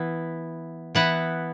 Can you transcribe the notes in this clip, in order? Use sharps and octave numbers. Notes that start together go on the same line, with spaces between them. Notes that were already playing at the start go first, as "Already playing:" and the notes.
Already playing: E3 B3 E4
E3 B3 E4 F#5